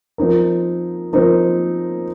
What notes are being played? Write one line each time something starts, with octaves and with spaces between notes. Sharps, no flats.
F3 C4 D#4 A#4
F3 C4 D#4 A#4